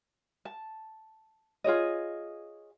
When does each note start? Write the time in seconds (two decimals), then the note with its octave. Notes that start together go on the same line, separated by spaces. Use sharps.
0.45 A5
1.64 F4 G#4 C#5 D#5